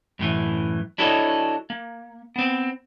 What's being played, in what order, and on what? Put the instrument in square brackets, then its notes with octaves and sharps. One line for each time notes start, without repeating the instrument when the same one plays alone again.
[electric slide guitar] F#2 A2 E3
D4 E4 F#4 A4 C#5 D#5
A#3
B3 C4